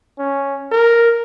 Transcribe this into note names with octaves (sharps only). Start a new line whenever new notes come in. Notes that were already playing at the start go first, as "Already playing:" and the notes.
C#4
A#4